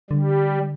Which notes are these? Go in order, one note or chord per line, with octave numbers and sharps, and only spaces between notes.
D3 G3